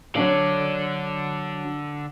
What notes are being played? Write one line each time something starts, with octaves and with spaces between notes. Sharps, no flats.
D3 F#3 D4 D5 F5